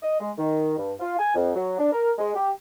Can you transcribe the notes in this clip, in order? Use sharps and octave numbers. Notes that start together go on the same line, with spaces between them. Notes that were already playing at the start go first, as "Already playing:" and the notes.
D#5
G#3
D#3
G2
F4
G#5
F2
F#3
D4
A#4
G#3
G4